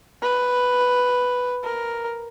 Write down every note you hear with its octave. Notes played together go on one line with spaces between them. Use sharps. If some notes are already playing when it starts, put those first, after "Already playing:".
B4
A#4